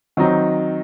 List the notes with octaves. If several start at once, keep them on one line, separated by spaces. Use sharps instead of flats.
D#3 F#3 C4 D#4